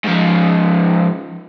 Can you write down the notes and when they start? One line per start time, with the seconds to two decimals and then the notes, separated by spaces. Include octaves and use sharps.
0.05 G#2 F3